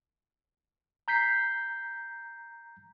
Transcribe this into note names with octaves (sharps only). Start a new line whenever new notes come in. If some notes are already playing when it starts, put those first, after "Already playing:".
A#5 G6 B6 C7